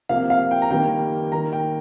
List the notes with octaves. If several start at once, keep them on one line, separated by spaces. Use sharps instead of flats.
C3 F3 A#3 F5
F5
G5
A#5
D#3 G3 A#3 G5
D#3 A#3 A#5
G5